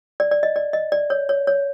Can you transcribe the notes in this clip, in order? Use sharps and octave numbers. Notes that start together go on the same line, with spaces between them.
D5
D5
D#5
D5
D#5
D5
C#5
C#5
C#5